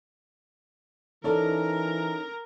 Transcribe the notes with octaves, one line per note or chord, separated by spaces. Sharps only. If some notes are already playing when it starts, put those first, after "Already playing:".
E3 C#4 D#4 A4 A#4 C#5 D5 A#5